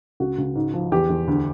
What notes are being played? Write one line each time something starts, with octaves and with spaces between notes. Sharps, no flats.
C#2 F#4
C#2
G#2
F3
E2 G4
E2
D2